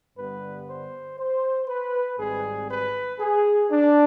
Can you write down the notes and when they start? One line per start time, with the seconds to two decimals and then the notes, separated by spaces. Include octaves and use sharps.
0.17 G2 D3 G3 B3 B4
0.68 C5
1.18 C5
1.68 B4
2.18 G#1 G#2 G3 C4 G#4
2.69 B4
3.20 G#4
3.71 D4